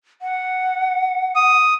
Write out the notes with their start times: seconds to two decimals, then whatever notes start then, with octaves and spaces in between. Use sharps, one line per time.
0.22 F#5
1.36 D#6